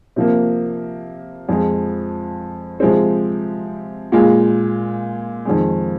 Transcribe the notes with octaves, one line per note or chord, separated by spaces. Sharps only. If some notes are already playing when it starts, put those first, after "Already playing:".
C3 F3 A#3
F2 F3 G#3
C3 F3 G#3 C4
A#2 G#3 F4
F2 D#3 G#3